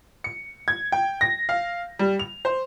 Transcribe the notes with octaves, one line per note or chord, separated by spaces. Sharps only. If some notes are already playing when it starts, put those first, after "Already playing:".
C#7
G#6
G5
A#6
F5
G3
F7
C5